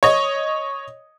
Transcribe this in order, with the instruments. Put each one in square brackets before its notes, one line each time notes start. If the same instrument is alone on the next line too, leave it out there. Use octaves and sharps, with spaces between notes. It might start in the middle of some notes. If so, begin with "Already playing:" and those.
[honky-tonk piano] C#5 D#5